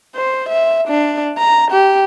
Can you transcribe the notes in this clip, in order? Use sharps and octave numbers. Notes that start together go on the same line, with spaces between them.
C5
E5
D4
A#5
G4